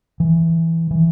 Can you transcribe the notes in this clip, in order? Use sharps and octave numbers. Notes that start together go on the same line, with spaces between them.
E3
E3